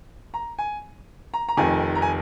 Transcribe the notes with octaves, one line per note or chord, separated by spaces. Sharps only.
A#5
G#5
A#5
A#5
F1 F2 D#3 G#5
A#5
G#5